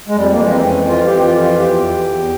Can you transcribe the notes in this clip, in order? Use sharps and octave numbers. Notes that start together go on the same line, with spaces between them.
G#3
F2 G3
A#3
E3 G#3
C4
F2 C#4
E3 F4
G4
F2
F4
E3
F4
E2 G4
E3
E2